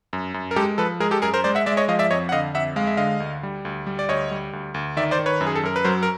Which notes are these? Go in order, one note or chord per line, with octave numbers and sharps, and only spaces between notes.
F#2
F#2
A#4
G#3 G4 A4
F3 A4 B4
G#3 G#4 A#4
G4 A4
F#2 G#4 A#4
A#4 C5
G#3 C5 D5
E5 F#5
G#3 D5 E5
C#5 D#5
F3 D#5 F5
D5 E5
F2 C#5 D#5
F#5
D3 D#5 F5
F2 E5 F#5
G#3 F5
E5
D3 D#5 F5
D2
G3
D2
G3
D5
D2 C#5 D#5
G3
D2
D2
D#3 D5 E5
C5 D5
D#3
B4 C#5
F#2
G#4
A4
F#2 A#4
B4
F#3 A#4 C5
A#4